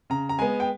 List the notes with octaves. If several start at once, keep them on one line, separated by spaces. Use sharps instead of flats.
C#3 A#5
A#5
G#3 B3 G#5
G5